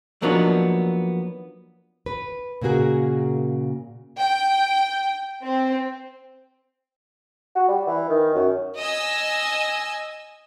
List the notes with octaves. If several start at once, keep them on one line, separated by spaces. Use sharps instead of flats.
F3 F#3 A#3 B3 D4 D#4
B4
A#2 C#3 A#3 F#4 G#4
G5
C4
F#4
G3
E3
D#3
F#2
D#5 G#5 E6